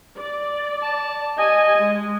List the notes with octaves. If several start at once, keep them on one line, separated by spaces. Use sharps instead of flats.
D5
A5
G4 D#5 G#5
G#3